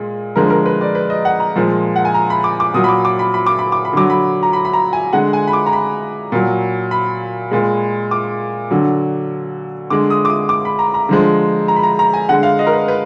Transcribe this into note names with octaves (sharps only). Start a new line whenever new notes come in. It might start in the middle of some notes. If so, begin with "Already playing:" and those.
Already playing: A#2 G#3
D3 F3 G#3 A#4
A#4
B4
D5
B4
D#5
F#5
A#5
A#2 F3 G#3
F#5
G#5
A#5
B5
D6
D6
A#2 F#3 D#6
B5
D6
D6
B5
B5
D6
B5
D6
B5
D3 F#3 D6
B5
A#5
B5
B5
A#5
G#5
D3 G#3 F#5
G#5
B5
D6
A#5
B5
A#2 F#3
B5
A#2 G#3
D6
D3 F#3
D3 G#3 D6
D#6
D6
D#6
D6
B5
A#5
A#5
D3 F3 G#3
A#5
B5
A#5
A#5
G#5
D3 G#3 F#5
F5
D#5
A#4
B4
B4